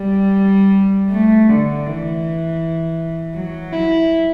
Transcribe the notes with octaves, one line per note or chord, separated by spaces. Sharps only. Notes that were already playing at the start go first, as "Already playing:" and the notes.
Already playing: G3
A3
D3
E3
F#3
E4